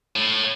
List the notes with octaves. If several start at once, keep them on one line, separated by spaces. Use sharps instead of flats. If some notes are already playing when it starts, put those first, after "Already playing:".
A2